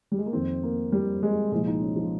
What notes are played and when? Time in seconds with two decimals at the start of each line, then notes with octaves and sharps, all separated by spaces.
0.12 G3
0.18 G#3
0.26 A#3
0.33 F2 D#3 C4
0.63 A#3
0.92 G3
1.23 G#3
1.52 C2 A#2 F3 G#3
1.67 D#4
1.82 C#4
1.96 F3